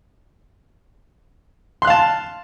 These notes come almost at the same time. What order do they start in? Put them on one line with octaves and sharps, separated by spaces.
C6 F#6 F5 A5